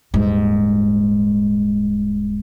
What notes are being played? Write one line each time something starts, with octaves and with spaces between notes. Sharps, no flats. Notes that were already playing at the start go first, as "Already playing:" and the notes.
D#1 G#2